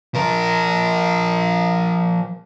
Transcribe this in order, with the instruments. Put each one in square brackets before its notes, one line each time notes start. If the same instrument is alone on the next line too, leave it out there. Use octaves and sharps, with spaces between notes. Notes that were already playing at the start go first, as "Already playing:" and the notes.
[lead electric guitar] F3 A#4